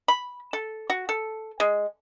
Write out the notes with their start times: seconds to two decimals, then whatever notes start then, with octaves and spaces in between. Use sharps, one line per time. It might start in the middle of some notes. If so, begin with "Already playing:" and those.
0.08 B5
0.53 A4
0.90 F#4
1.09 A4
1.60 G#3